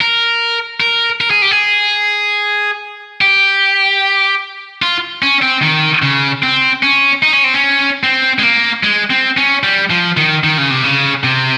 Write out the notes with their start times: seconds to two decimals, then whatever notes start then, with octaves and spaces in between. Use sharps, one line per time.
0.01 A#4
0.80 A#4
1.21 A#4
1.31 G#4
1.42 G4
1.51 G#4
3.21 G4
4.82 F4
5.22 C#4
5.42 C4
5.62 D#3
6.02 C#3
6.43 C4
6.83 C#4
7.23 D#4
7.33 C#4
7.44 C4
7.54 C#4
8.03 C4
8.39 G#3
8.43 A#3
8.83 G#3
9.10 C4
9.37 C#4
9.63 G3
9.90 F3
10.17 D#3
10.44 D#3
10.58 C#3
10.70 C3
10.84 C#3
11.24 C3